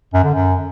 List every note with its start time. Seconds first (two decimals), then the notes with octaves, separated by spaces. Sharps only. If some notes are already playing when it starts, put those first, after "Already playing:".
0.14 F#2
0.24 D3
0.34 F#2